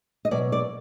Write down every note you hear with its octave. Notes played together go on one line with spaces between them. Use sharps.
D#5
B2 F#3 D5
D5